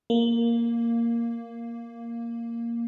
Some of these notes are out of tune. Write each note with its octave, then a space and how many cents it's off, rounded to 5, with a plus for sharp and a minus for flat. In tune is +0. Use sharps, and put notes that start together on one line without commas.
A#3 +0